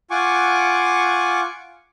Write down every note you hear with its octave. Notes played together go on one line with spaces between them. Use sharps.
F4 F#5 G#5 C#6 D6